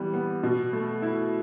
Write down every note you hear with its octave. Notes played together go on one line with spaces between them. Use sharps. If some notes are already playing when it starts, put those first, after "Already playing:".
Already playing: E3 G3 B3
B3
B2
A3
E4